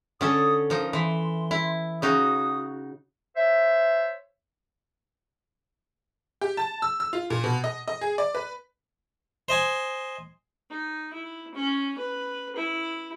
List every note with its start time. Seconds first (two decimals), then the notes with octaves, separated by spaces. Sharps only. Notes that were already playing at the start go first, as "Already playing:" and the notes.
0.21 D3 C#4 A4 D#6
0.70 F3 D#4 A#4
0.93 E3 C6
1.51 E4
2.02 C#3 D#4 F#4 D#6
3.36 C5 C#5 E5
6.41 G4
6.57 A5
6.82 E6
7.00 E6
7.13 F4
7.30 A#2
7.44 B2
7.64 D#5
7.88 D#5
8.01 G#4
8.18 D5
8.35 B4
9.48 C5 D#5 G#5
10.70 D#4
11.13 E4
11.55 C#4
11.98 B4
12.56 E4